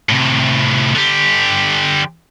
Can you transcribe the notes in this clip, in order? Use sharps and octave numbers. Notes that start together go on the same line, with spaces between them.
A2 C3
D3 G4